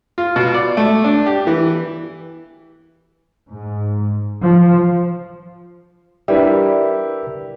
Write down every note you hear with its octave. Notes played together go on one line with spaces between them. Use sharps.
F4
B2
D5
A3
D4
G4
E3
G#2
F3
G3 D4 E4 G4 A#4 B4 E5